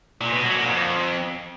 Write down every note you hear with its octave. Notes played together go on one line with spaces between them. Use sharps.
A#2
B2
F#3
A#2
F2